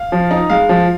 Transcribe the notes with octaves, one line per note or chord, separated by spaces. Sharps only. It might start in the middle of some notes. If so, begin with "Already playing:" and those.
Already playing: F5
F3
D#4
G#3 F5
F3